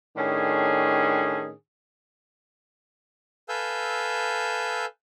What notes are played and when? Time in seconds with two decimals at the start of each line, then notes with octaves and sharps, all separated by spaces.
0.17 A2 D#3 C#4 D4 G#4
3.49 A4 B4 F5 G#5 E6 G6